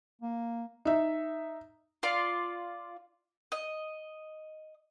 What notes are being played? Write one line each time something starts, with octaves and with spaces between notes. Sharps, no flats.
A#3
D#4 E5
F4 D5
D#5